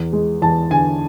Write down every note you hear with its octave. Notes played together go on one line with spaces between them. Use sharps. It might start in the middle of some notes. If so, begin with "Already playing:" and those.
Already playing: E2
G#3
E2 A5
D3 G#5